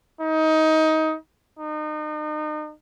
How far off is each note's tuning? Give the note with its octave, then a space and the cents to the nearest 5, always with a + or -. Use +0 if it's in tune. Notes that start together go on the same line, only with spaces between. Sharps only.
D#4 +20
D#4 -35